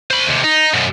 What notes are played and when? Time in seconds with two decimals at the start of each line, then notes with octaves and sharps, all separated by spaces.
0.11 C5 B5
0.27 D#2 C3
0.44 D#4
0.74 F#2 B2